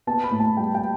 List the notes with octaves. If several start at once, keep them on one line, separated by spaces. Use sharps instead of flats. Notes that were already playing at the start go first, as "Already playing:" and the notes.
B3 A5
B5
A2
A5
G3 G5
G5